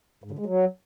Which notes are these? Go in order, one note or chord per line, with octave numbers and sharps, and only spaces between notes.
G#2
D3
G#3
F#3